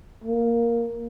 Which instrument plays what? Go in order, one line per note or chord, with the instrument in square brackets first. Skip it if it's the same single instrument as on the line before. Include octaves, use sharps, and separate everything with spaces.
[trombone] A#3